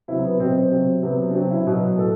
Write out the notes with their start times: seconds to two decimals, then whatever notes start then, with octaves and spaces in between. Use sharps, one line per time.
0.08 C3 F#3 E4
0.24 B3
0.39 B2 F#3 C4
0.56 C4
0.71 C3 F#3
1.03 C3 F#3 B3
1.31 D4
1.35 C3 F#3 C4
1.51 E4
1.67 B2 F#3
1.98 A2 A4